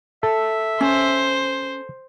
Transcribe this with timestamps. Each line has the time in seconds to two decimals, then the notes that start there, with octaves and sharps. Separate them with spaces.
0.23 A4 E5
0.81 C#4 C5